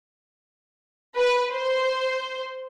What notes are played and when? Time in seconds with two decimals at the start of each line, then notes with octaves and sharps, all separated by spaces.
1.17 B4
1.52 C5